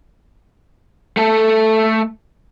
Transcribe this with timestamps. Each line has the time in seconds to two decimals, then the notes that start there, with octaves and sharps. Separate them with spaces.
1.17 A3 A4